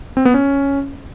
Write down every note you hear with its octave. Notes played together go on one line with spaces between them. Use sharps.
C4
B3
C#4